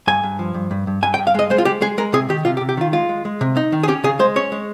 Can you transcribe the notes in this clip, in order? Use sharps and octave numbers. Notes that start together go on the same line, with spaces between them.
G2 G#5
G2
F3
G2
G2
G2
G2 G#5
G5
G2
F5
G#3 D#5
G#3 C5
F4
G#3 G4
G#3 G#4
G#3 A#4
C3 G#4
D#3 G4
C3 F4
G4
C3
G4
D#3 F4
G#3 F4
G#3
G#3
C3
D#4
D#3
G#4
C#4 G4
C#3 G#4
G#3 C5
C#4 C#5
G#3